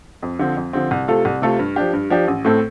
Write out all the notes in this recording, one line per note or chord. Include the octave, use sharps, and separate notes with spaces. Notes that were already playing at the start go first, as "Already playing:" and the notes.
F2
D3 F3 C4
F2
D3 F3 C4
C2
C3 A3 F4 A4
C2
C3 A3 F4 A4
G2
F3 D4 G4
G2
F3 D4 G4
A1
A2 A3 C4 A4